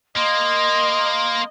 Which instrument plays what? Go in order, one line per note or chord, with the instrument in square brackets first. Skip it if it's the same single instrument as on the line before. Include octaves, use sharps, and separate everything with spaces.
[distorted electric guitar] A#3 [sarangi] D#5 [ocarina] C6